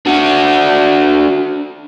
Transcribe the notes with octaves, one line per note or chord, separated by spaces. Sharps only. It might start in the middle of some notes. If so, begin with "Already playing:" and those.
D4 F#4